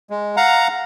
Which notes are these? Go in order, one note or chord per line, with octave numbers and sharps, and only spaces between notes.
G#3
F5 F#5 A#5